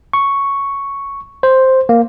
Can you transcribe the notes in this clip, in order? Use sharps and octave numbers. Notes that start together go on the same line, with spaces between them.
C#6
C5
A#3